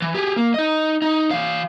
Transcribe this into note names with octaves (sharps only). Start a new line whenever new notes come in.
E3
G4 G#4
A#3
D#4 D#5
D#4
E3 F5